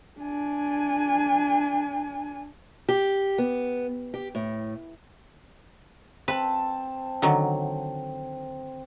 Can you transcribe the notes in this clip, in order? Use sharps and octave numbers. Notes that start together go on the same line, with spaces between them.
D4 G#5
G4
B3
G4
A2
C4 B4 A5
D3 D#3 F#3